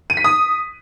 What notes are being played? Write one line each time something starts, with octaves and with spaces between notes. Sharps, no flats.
D#7
B6
D#6